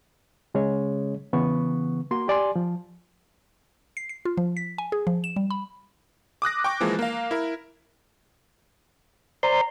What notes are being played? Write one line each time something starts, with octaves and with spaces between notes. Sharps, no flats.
C#3 G#3 C#4 G#4 C#5
C#3 E3 B3 C#6
A#3 F#4 C6
G4 D5 G#5 C6
F3
C7
C7
F4
F3
B6
G#5
G#4
F3
E7
G3
B5
D6 D#6 F#6 A#6
G5 C#6 D6
E3 F3 G#3 A#3
A#3 F5
E4 A#4
C5 D5 A#5 C6